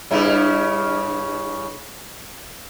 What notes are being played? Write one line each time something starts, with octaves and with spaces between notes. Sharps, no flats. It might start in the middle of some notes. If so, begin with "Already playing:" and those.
G2 C#3 E4